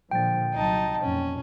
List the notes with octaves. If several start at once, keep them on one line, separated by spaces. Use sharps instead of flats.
A#2 D3 F3 G5 A6
C2 F#3 D#4 A5
B1 F2 A#2 C#4